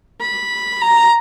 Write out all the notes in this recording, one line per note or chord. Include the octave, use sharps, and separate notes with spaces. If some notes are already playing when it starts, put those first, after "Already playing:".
B5
A#5